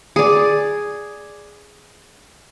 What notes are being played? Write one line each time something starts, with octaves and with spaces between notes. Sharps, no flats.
G#4 D5